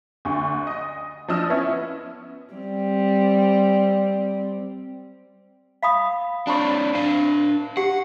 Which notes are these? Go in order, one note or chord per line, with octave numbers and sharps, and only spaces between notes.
D2 D3 C#6
D#5
F3 D4 D#5 E6 F6
B3 C#4 E4
G3 C4
F5 B5 D#6
C4 D4 E4 B5 C#6
D4 F5
G4 F#5